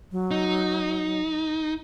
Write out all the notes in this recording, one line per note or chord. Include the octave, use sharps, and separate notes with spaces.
F#3
D#4